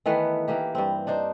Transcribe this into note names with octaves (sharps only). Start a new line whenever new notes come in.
D#3 E3 A3 B3
E3 A#3 G4
G2 C4
D4 D#4 C5